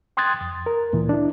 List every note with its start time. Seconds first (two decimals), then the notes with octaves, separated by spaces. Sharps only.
0.17 G5 C6 D#6 F#6 G#6 A6
0.41 F2
0.66 A#4
0.93 D2 A#2 E3
1.09 D4 E4